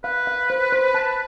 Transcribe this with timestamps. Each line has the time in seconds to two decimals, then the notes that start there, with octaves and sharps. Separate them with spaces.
0.04 B4 F5
0.27 F5
0.50 C5
0.72 C5
0.95 A5